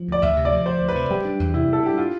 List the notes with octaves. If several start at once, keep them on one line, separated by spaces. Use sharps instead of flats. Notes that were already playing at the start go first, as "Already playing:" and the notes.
Already playing: F3
D2 D5
D2 E5
C3
D5
F3
D2 C5
D2
B4
C3
G3 G4
D4
E2
C3 E4
G3 A4
D4 G4
F4